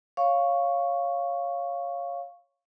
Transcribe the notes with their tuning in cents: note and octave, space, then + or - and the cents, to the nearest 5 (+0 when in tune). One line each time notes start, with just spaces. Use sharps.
C#5 +0 F5 +0 C#6 +0